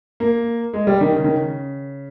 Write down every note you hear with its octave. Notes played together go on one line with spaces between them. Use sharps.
A#3
G#3
G3
D#3
C#3
D#3
C#3